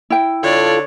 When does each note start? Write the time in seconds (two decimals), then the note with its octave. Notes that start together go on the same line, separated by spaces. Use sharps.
0.10 E4 G5
0.43 D3 F4 A4 C#5 D5